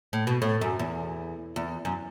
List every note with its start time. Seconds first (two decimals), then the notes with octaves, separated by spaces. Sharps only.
0.13 A2
0.27 B2
0.42 A2
0.61 F#2
0.79 E2
1.56 E2
1.85 F#2